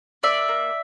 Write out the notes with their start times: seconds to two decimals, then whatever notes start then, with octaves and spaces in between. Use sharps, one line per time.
0.23 A#3 D5 E5
0.48 A#3